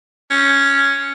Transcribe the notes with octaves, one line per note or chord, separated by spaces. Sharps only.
C#4